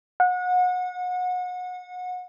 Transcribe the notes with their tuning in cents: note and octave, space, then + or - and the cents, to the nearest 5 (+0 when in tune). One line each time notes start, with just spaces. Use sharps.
F#5 -30